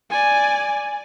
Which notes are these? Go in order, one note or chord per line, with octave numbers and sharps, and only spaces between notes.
D5 G#5